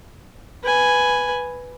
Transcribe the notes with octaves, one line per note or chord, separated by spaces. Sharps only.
B4 G#5